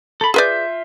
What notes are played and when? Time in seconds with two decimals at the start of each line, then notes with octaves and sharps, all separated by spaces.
0.21 A4 B5
0.34 F4 G#4 B4 D5 E5 G6